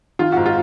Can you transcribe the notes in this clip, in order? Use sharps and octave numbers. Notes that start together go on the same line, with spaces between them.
D#3 F4
G#2 F#4
F4